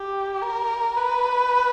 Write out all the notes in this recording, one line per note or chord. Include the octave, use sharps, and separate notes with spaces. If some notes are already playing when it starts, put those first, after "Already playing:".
Already playing: G4
A#4
B4